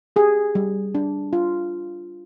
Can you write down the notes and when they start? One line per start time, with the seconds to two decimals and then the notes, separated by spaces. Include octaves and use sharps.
0.16 G4 G#4
0.55 G3
0.95 D4
1.33 F4